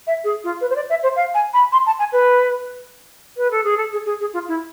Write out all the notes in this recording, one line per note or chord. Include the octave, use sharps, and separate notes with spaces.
E5
G#4
F4
B4
C5
D5
E5
C5
F5
G#5
B5
C6
A5
G#5
B4
B4
A4
G#4
A4
G#4
G#4
G#4
F4
E4